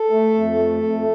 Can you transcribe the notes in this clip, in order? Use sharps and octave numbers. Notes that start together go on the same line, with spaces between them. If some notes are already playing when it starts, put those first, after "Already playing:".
Already playing: A4
A3
F2
A3
F2